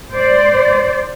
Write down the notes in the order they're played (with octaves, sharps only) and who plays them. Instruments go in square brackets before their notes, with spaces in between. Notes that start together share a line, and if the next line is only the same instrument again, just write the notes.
[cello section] C5 D5